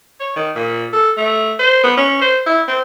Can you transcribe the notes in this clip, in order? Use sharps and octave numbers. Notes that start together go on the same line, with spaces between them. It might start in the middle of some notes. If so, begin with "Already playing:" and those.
C#5
D#3
A#2
A4
A3
C5
B3
C#4
C5
E4
C4